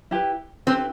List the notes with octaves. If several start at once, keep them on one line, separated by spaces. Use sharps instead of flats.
E4 G4 B4
C4 E4 G4 B4